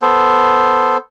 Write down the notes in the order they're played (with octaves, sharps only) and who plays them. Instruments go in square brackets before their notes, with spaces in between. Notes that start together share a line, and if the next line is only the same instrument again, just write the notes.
[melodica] B3 A4 C5